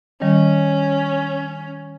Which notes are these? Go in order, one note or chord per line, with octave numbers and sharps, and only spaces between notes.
D#3 G3 C#4